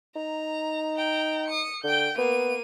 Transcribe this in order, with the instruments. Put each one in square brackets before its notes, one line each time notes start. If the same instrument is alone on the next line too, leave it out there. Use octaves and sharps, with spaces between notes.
[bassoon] D#4 [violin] A#5
[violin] G5 A#5
D#6 C#7
[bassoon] D3 [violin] G5 G6
[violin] A#3 D#7 [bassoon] B3